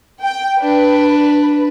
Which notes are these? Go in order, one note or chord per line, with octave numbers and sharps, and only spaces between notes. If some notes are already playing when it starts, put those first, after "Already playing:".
G5
D4 B4